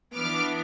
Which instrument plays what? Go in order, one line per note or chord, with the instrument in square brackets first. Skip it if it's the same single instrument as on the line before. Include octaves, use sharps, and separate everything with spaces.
[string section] E3 B3 D4 D6 F6